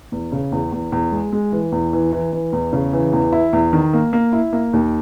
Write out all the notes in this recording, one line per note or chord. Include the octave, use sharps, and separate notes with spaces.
E2
C#3
E2
E2
E2
G#3
G#3
E3
E2
E3
E3
E3
E2
C#3
E3
E2
E4
E2
D#3
A#3
A#3
E4
A#3
D#2